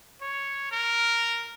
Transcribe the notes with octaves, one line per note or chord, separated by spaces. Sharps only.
C#5
A#4